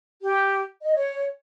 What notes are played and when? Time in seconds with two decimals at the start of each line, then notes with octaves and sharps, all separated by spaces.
0.22 G4
0.82 D#5
0.95 C#5